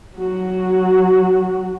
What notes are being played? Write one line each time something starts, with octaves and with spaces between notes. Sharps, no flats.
F#3 F#4